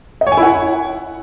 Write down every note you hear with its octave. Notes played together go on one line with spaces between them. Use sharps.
D#5
C#5
G#5
E4
F#5